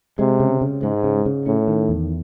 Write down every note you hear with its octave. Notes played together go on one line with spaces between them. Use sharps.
C3 G#3
C#3
C#3
G#2 G#3
C#3
C#3
A2 C#4
D#3
E2